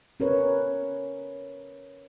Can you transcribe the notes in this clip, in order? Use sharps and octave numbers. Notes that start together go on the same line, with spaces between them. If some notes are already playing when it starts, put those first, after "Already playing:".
C#4 A#4 B4 C#5